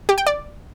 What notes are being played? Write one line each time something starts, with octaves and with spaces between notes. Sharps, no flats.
G4
G5
D5